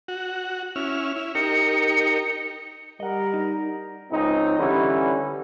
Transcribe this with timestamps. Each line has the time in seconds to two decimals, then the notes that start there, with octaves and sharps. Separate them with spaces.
0.08 F#4
0.76 C#4 E4 F6
1.16 E4
1.35 D#4 G4 A#4 C#7
3.00 G3 A#4 D#5 F#5
3.34 D#4
4.11 C#2 C4 D#4
4.58 D3 E3 G3 C#4